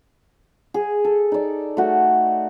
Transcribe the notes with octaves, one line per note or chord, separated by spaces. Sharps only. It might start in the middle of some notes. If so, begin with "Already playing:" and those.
G#4
A4
D#4 D5
A3 F#4